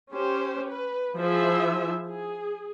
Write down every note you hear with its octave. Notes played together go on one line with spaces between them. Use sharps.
C#4 G4 C5
B4
F3 E4 F4 G#4 C5 E5
G#4